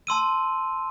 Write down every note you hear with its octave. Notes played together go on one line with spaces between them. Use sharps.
A5 C6 E6 D#7